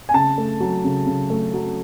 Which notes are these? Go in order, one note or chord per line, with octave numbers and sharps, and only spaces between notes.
G#5
C#3 A5
A3
F#3
C#3
C#3
A3
F#3